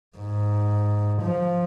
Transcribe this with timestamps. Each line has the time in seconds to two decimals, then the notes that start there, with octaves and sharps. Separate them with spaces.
0.18 G#2
1.22 F3